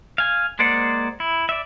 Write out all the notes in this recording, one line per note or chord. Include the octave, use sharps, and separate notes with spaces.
F5 G#5
G#3 A#3 C5 D5 F#5
E4
D5 E5